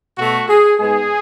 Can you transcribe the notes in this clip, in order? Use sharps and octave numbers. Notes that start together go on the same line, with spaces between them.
B2 A3 F#4
G#4
G#2 G#3 B3 G#4